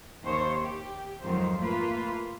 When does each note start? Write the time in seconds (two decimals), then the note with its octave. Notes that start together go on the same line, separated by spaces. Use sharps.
0.24 D#2 C5 C#5
0.62 G4
1.23 F2 G#2 D#3 F#3 F4 C5
1.58 A3 A#3 F4 B4